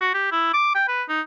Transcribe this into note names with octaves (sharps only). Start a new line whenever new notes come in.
F#4
G4
E4
D6
G5
B4
D#4